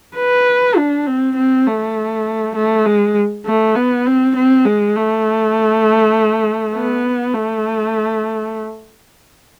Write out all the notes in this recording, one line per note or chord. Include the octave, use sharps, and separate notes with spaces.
B4
D4
C4
C4
A3
A3
G#3
A3
B3
C4
C4
G#3
A3
B3
A3